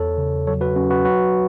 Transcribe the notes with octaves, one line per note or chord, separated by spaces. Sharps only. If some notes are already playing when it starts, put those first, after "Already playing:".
Already playing: E2 A4 C#5
C#3
F#3 A4 C#5
F#4 B4
F#3 C#4 F#4
F#4 B4
F#3 F#4 B4